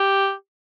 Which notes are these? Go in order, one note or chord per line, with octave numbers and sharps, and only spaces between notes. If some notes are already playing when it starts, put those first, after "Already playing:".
Already playing: G4